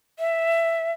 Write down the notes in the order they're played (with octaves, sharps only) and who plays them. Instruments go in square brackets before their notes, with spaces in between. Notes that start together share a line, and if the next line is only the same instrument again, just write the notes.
[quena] E5